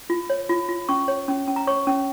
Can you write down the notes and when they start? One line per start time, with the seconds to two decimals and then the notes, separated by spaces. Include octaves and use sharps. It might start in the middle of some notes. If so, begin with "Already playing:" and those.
0.10 F4
0.30 C#5
0.49 F4
0.69 F4
0.89 C#4 C#6
1.08 C#5
1.28 C#4
1.48 C#4
1.56 A#5
1.67 C#5 C#6
1.87 C#4